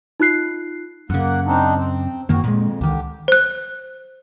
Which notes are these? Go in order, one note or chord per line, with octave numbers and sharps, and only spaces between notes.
D#4 F4 F#6 C7
F#2 C#3 A#3 F#5
C4 D4 D#4
C4
F#2 D#3 A#3 C4 F#4
F2 A#2 G#3
C#2 D3 D#3 G4
C5 F#6